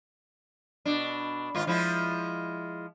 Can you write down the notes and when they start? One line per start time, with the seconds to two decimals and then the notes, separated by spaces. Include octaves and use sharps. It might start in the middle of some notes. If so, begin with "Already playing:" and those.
0.85 B2 D4
1.55 G#2 D#3 F4
1.67 F3 G#3 E4